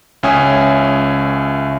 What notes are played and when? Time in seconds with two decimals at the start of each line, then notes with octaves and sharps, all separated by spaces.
0.23 C#2 C#4 E5 G#5 D#6 G#6